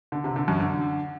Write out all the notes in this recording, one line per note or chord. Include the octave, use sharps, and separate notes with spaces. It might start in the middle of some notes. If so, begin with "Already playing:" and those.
D3
C3
D3
F#2
D3